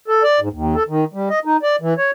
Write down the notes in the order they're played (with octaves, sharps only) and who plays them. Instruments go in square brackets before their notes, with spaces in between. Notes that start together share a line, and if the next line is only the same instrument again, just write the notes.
[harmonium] A4
D5
G#2
D#2
A4
D#3
G3
D#5
D#4
D5
E3
C#5